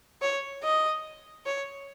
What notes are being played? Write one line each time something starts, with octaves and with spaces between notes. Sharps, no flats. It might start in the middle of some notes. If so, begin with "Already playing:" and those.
C#5
D#5
C#5